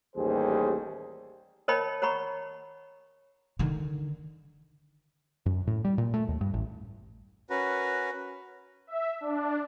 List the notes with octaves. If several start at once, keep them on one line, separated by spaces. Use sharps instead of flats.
A1 D#2 G3 G#4 C5
A#4 C#5 D#5 G5 A5 B5
C#5 F#5 A#5 B5 C#6
D3 D#3
F#2
A2
G3
A#2
A3
D#2
G2
A1
C#4 F#4 A#4 B4
E5
D4